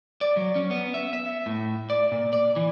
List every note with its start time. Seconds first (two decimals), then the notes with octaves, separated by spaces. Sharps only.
0.21 D5
0.37 F#3
0.55 C#4
0.71 B3
0.94 E5
1.13 E5
1.46 A2
1.90 D5
2.12 A#2
2.33 D5
2.56 E3